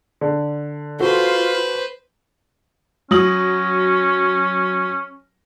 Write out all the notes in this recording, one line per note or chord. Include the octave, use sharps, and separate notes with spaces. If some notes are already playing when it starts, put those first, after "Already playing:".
D3
F4 F#4 A4 B4 C5
F#3 C#4 D#6 F#7